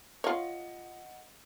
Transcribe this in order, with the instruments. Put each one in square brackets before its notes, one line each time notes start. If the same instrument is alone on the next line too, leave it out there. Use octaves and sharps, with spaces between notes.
[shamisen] F4 C#5 [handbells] D#5 F#5